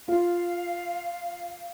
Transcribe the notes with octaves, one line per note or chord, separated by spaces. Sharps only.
F4 F5